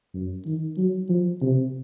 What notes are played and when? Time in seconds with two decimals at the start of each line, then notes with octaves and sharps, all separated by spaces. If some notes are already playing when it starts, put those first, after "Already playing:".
0.14 F#2
0.46 D#3
0.78 F#3
1.09 F3
1.42 C3